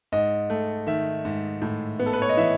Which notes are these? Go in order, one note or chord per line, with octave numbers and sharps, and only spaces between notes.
G#2 D#5
A3
D#3 E5
G#2
A2
B3
A4
B4
C#5
D#5
E3 E5